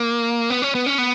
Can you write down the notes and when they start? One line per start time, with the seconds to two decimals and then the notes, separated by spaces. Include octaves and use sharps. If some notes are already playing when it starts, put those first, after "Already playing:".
Already playing: A#3
0.50 B3
0.62 C#4
0.75 B3
0.86 C#4
0.98 B3